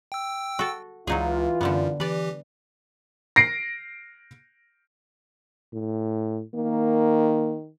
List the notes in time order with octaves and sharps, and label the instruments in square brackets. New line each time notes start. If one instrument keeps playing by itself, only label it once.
[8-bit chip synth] G5 E6
[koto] F#4 A4
[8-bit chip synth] C#2 [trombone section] E3 F4 [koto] F#3 D#4 G#4
[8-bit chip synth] F#2 [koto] D3 G3 B3
[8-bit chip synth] E3 G4 [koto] B4 D5
[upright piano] A#6 C7 D7
[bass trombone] A2
[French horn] D#3 [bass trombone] A#3